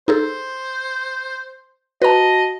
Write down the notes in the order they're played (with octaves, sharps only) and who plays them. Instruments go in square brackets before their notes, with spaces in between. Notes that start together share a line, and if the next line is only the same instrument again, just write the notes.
[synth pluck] D#4 G#4 A4 [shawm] C5
[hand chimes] F#4 A5 [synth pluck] B4 A#5 [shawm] D#5